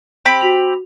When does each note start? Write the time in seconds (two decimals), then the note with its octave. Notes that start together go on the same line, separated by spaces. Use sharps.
0.25 C4 G4 B5
0.41 F#4 F7